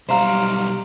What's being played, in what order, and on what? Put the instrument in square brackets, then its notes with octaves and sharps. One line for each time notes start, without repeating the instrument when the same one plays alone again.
[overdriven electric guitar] B1 G3 [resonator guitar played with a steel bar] C5 F5 [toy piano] E5 A#5